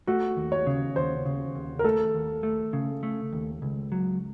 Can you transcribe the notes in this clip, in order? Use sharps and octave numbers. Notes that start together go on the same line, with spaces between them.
A3 F#4
D#2
C#5
C#3
D#2 C5
C#3
D#2
A#4
A3 A4
D#2
A3
C#3
A3
D#2
C#2
F#3